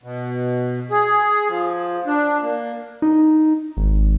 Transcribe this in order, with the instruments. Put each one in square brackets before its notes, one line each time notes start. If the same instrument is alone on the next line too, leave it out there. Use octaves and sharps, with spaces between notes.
[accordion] B2
G#4
F3
D4
A#3
[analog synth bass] D#4
G#1